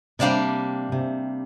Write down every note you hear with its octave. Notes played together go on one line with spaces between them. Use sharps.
C3 G3 A#3 D4 G4 D5
C3